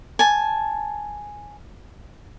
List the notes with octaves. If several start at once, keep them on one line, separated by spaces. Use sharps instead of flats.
G#5 A5